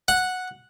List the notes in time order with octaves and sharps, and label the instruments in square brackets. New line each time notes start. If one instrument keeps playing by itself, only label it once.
[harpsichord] F#5